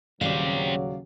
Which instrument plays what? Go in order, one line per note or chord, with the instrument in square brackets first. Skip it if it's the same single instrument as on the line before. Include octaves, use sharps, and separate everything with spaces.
[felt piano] D#1 [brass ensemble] C#3 F#3 [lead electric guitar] G3 C4 [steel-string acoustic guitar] D5 F5